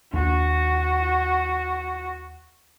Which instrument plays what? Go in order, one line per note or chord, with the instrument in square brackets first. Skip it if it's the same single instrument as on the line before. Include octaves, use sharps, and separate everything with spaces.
[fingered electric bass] D#2 D4 [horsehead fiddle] F#4